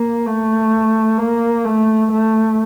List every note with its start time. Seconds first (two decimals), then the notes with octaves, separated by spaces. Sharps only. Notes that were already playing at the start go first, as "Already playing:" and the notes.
Already playing: A#3
0.25 A3
1.18 A#3
1.64 A3
2.11 A3